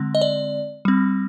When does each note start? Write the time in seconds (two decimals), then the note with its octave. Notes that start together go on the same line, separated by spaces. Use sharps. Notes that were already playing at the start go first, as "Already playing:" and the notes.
Already playing: D3 G#3 C4
0.15 D#5
0.22 D5
0.85 G3 C4